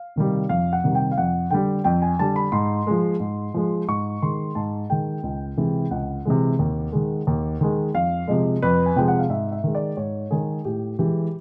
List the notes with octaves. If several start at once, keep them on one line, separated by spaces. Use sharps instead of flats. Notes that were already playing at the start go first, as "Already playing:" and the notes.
Already playing: F5
C3 D#3 G3
F2 F5
F#5
C3 D#3 G3
G5
F5
F2 F#5
D3 G3 G5
F2 G5
G#5
D3 G3 A5
B5
G#2 C6
F3 G#3
G#2
F3 G#3
G#2 C#6
D#3 G#3 C6
G#2 A5
D#3 G#3 G5
C#2
C3 E3 G#3
C#2 F#5
C3 E3 G#3
D#2
D#3 G#3
D#2
D#3 G#3
F2 F5
C3 F3 G#3 D#5
F2 B4
G#5
C3 F3 G#3 G5
F#5
F5
G#2 E5
E5
D#3 G#3
D5
G#2 C#5
D#3 G#3 G#4
A2 G4
E3 G#3 G4